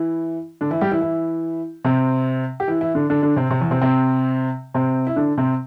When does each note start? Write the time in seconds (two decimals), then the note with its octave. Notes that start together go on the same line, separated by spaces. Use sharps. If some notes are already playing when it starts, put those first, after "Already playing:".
Already playing: E3 E4
0.61 D3 D4
0.71 E3 E4
0.81 G3 G4
0.91 E3 E4
1.01 E3 E4
1.85 C3 C4
2.60 G4
2.68 E3 E4
2.81 E3 E4
2.95 D3 D4
3.10 D3 D4
3.22 D3 D4
3.36 C3 C4
3.50 C3 C4
3.60 E2 E3
3.71 C3 C4
3.81 C3 C4
4.74 C3 C4
5.07 E4
5.16 D3 D4
5.38 C3 C4